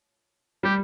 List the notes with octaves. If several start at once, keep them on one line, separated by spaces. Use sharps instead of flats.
G3 G4